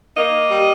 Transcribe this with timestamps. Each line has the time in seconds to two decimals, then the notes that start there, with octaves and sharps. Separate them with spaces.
0.17 A#3 D#5
0.50 G3